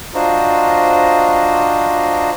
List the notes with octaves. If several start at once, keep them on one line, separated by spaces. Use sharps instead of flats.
D4 F4 F#4 C5 D#5 A#5